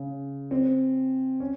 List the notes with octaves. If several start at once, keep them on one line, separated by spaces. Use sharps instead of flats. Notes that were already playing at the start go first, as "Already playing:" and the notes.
Already playing: C#3
C4
C#4